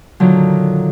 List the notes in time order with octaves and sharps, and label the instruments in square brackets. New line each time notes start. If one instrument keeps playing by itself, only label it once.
[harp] A#2 D3 D#3 F#3